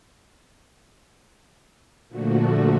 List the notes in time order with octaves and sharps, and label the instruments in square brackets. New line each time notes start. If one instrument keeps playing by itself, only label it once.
[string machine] A#2 D3 F3 A3 F#4